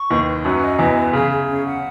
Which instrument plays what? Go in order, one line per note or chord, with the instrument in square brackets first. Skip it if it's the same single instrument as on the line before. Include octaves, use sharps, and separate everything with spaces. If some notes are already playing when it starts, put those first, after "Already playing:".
Already playing: [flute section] C#6
[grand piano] D#2 D#3 [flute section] B4
[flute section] B4
[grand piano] F#2 F#3 [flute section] C#4
[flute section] D#5
[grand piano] E2 E3 [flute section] B4
[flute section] B4
[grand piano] C#3 [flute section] G#4
[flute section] G#4
C#4
F#5